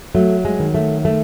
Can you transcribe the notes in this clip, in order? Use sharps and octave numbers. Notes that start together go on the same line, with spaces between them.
F#3 A3
G#3
D#3
A3
A3